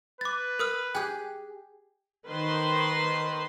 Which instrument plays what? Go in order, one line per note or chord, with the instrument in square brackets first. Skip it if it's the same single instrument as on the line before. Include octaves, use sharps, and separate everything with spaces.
[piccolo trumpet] B4 [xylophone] D6 A6
[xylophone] A#4 D#6 F6
[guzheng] G4 G#4 [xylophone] G5 F#6
[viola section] D#3 B4 C5 C6